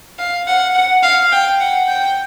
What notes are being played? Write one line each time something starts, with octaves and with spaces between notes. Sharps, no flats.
F5
F#5
F#5
F5
G5
F#5
G5